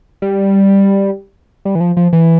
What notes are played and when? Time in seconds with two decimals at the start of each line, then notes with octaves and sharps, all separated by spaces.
0.22 G3
1.65 G3
1.75 E3
1.81 F3
1.97 F3
2.13 E3